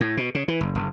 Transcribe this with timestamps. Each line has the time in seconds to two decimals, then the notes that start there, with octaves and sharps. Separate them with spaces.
0.01 A2
0.17 B2
0.35 C#3
0.48 E3
0.61 F#1
0.75 F#1